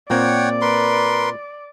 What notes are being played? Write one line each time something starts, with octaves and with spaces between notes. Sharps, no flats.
A#2 A#3 C4 C#5 D5 F#5 G5
A#4 B4 C6